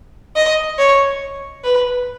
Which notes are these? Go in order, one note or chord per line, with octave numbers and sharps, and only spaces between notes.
D#5
C#5
B4